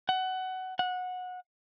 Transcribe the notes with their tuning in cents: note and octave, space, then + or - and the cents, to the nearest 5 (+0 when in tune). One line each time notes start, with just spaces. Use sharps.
F#5 +20
F#5 -20